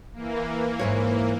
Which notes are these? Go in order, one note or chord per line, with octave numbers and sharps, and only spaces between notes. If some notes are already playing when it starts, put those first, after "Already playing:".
E3 A#3
G#2 B2 C#5